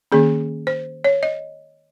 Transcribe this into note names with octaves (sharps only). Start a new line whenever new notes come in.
D#3 A#3 C#4 G#4
C5
C#5
D#5